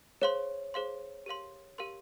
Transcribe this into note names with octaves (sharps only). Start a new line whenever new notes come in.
G#4 C5 C#5 F5 C6
G#4 C5 F5 C6
G4 A#4 F5 C6
G4 A#4 F5 C6